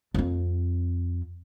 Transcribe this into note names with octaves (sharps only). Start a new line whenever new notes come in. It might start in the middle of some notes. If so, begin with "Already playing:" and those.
F2 C4